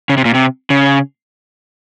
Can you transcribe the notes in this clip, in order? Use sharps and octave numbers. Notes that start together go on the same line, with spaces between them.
C#3
C3
A#2
C3
C#3